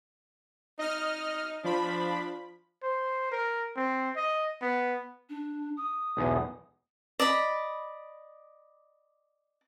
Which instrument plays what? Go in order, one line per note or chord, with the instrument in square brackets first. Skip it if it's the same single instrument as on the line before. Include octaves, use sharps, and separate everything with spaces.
[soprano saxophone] D#4 [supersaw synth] D#5 F6
[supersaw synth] F3 B5 [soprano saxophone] D4
[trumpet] C5
A#4
C4
D#5
B3
[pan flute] D4
D#6
[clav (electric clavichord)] B1 E2
[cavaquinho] D5 D#5 B5